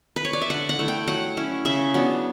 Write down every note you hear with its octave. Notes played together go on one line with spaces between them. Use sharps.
B4
C#5
D5
E5
D3 F#5
F#5
A3 E4
G5
F#3 F#5
C#4 E4
C#3 E5
F#3 B3 D4